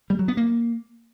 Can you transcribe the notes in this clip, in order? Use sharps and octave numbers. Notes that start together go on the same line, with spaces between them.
G3
F#3
B3
A#3